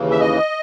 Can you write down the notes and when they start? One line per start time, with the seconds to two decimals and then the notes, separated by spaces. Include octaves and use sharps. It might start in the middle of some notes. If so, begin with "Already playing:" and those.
Already playing: D#2 C#3 E3
0.11 E5
0.20 D#5